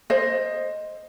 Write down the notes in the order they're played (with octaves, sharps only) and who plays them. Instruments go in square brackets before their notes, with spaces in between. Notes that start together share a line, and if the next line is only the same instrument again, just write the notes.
[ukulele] C5 D#5